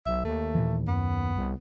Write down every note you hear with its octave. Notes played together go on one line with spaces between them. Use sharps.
B1 E5
D#2 A3
A#2 E3
F#2 B3
C2